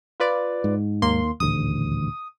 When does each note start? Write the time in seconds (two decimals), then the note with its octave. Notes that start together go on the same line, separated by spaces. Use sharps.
0.20 F4 B4 D5
0.64 G#2
1.02 D#2 A#3 C6
1.40 D#1 A1 D2 D#6